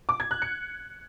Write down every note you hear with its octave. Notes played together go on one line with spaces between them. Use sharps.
D6
G#6
F#6
C#7